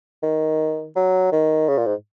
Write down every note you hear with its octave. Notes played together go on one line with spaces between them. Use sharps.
D#3
F#3
D#3
C#3
A#2
G#2